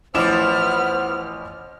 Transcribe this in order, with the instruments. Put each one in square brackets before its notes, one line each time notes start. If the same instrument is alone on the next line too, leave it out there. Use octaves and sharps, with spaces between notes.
[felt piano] A1 D6 E7 [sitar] F3 E4 [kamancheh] B3 F6 [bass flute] C5